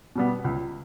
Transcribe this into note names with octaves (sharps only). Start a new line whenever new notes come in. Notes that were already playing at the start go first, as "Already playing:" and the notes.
B2 G3 B3
C#2